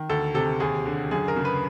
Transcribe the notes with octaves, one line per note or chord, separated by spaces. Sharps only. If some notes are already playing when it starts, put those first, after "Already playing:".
Already playing: D#3
D2 A4
C3 A4
D#2 G#4
D3
F#2 G#4
A#4
C#3
B4